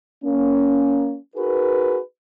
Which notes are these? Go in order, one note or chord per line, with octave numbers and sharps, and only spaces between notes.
A#3 C#4
D#4 F#4 G#4 A#4 B4